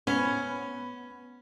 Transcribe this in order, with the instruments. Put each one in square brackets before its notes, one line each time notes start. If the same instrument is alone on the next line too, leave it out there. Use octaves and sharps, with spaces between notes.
[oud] B3 [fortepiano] C#4